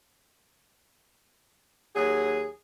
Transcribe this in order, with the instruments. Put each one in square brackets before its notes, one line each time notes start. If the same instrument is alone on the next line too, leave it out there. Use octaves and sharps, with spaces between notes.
[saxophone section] D#2 F#3 G#4